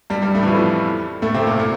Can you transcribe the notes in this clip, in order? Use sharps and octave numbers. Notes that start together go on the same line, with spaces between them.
G2 G3
G2 G3
A2 A3
E3
F2 F3
A2 A3
C3 C4
A#2 A#3
A#2 A#3